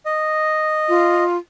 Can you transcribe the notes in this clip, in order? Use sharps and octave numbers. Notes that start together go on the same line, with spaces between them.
D#5
F4